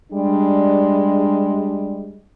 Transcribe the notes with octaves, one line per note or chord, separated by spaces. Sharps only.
G3 G#3 D4